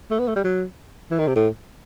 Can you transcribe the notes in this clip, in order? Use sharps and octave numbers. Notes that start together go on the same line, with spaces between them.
A3
B3
A3
G3
F#3
E3
D#3
C3
A2